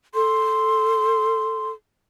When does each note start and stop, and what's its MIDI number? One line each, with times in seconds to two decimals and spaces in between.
0.14 1.72 69
0.14 1.70 84